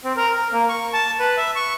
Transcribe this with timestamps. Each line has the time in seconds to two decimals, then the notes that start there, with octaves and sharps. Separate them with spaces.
0.04 C4
0.17 A#4
0.34 A#4
0.53 A#3
0.69 C#6
0.93 A5
1.19 B4
1.37 E5
1.55 C#6